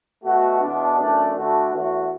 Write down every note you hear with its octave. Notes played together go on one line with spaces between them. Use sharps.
B2 A3 F#4
E2 B2 B3 D4
F#2 E3 A3 D4
D3 A3 D4 F#4
E2 E3 A3 F#4